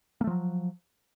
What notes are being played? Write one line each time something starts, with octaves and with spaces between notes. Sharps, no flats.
F3 F#3 A3 A#3